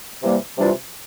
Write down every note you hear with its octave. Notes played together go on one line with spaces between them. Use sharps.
C3 E3 G3 A#3
C3 E3 G3 D4 F4